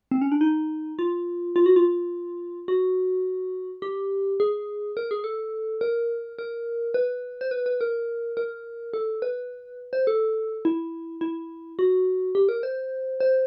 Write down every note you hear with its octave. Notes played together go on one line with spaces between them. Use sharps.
C4
C#4
D4
D#4
F4
F4
F#4
F4
F#4
G4
G#4
A#4
G#4
A4
A#4
A#4
B4
C5
B4
B4
A#4
A#4
A4
B4
C5
A4
E4
E4
F#4
G4
A#4
C5
C5